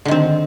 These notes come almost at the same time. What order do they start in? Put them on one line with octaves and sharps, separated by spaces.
D3 D#3 C4